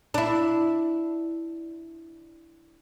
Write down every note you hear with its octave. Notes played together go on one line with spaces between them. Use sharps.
D4 E4